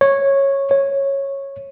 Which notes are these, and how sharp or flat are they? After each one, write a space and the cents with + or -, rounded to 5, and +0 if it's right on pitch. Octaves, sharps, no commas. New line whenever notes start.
C#5 -10
C#5 -10